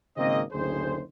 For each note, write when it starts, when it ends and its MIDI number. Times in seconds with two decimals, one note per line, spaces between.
0.17 0.41 32
0.17 0.41 49
0.17 0.41 58
0.17 0.41 60
0.17 0.41 75
0.52 1.01 30
0.52 1.01 38
0.52 1.01 45
0.52 1.01 68
0.52 1.01 72